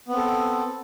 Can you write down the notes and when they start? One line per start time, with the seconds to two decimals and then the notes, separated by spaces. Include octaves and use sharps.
0.08 B3
0.13 C4
0.17 A4